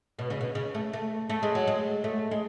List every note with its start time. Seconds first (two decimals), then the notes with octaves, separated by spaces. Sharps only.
0.19 B2
0.30 C#3
0.41 B2
0.55 C#3
0.75 A3
0.93 A3
1.29 A3
1.43 G#3
1.55 F#3
1.67 G#3
2.04 A3
2.31 G#3